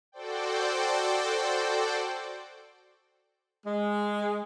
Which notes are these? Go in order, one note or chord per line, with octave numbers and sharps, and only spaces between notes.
F#4 A4 C5 D5 G5
G#3